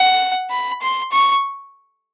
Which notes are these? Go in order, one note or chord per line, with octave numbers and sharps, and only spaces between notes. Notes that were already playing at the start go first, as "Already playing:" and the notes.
Already playing: F#5
B5
C6
C#6